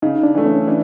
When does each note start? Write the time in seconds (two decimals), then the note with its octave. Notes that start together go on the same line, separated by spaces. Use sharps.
0.02 C#3 D#4
0.23 D4
0.35 E3 A3
0.46 C#4
0.67 E3 D4